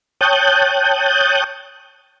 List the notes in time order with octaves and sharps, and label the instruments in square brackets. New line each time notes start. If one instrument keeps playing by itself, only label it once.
[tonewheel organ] C#5 G5 A5 D#6 F#6 G6